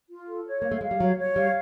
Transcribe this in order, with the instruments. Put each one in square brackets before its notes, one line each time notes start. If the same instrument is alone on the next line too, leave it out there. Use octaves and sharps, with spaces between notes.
[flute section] F4
A4
C#5
[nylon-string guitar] A#3 [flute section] F5
[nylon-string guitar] A3
[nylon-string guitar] G#3 [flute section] F5
[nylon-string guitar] G3
[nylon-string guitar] F#3 [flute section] C#5
[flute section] C#5
[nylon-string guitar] G3 [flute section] F5